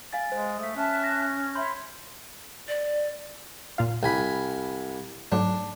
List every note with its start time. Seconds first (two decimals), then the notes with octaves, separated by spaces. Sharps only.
0.13 F5 G#5 A6
0.32 G#3 C5
0.60 A3 D#6 B6
0.76 C#4 E5 A5 F#6
1.04 A#6
1.55 C#5 E5 B5 C6 G6
2.68 D5
3.78 A#2 F4 F5
4.03 C2 G#5 B5
5.32 G#2 F#3 A3 D4